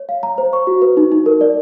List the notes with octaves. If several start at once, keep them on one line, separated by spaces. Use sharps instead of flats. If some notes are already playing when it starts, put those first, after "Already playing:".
Already playing: C#5
F5
A#5
C5
C#6
F#4
B4
D#4
D#4
A#4
D5